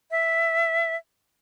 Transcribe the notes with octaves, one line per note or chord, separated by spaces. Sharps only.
E5